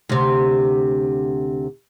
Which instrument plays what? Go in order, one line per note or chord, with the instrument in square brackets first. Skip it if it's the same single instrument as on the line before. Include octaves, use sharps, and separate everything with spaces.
[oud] D2 C3